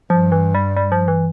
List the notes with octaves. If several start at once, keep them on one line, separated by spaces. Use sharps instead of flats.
G2 F3
E3
G3
G3
F3
E3